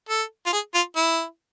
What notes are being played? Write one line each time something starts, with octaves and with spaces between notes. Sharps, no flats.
A4
F4
G#4
F4
E4